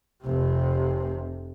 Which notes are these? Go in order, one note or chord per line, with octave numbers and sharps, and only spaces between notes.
F1 C3